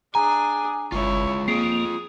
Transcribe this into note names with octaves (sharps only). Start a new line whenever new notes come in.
D4 G#4 G#5 A#5
G1 G#3 E4 F4 C#5
A#3 C4 F4 G#4 C7